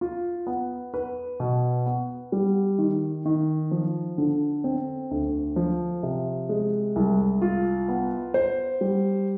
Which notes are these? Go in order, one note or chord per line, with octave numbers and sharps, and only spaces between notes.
F4
B3
B4
B2
B3
G3
D#3
D#3
F3
D3
C4
D2
F3
C3
G#3
C2
F4
B3
C5
G3